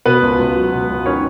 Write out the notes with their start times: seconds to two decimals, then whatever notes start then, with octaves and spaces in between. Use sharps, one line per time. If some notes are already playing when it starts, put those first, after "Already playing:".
0.06 B2 B3 B4
0.22 C#2
0.39 C#2
0.56 F#3
0.72 B2
0.89 C#2
1.06 D#3 C#4 C#5